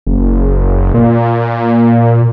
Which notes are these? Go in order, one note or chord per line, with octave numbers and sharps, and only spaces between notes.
F#1
A#2